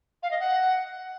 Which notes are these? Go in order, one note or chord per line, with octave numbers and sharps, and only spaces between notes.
F5
D#5
F#5